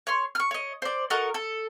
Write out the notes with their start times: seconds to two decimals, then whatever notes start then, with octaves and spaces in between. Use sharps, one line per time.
0.07 C#5 C6
0.35 C#6 F6
0.51 C#5 D#5
0.82 C5 D5
1.10 F#4 A4 A#4 D#5
1.34 A4